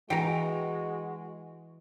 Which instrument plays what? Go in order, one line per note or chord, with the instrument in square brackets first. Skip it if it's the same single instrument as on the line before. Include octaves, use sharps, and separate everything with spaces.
[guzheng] E3 [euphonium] G#3 [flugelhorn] F#4 [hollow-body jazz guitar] G5 A#5